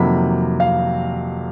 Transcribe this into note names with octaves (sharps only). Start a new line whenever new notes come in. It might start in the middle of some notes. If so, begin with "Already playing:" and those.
Already playing: F2 C3 D#3 F#3 A#3 B5
F5